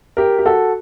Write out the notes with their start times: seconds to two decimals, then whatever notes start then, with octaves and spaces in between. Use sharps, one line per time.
0.17 G4 A#4
0.39 G4
0.46 F#4 A4